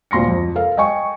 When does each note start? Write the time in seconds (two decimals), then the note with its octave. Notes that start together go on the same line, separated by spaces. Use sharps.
0.11 D2 A#2 C6 A#6 C#7
0.28 F2
0.55 A4 A#4 F5
0.77 D#5 G5 G#5 C#6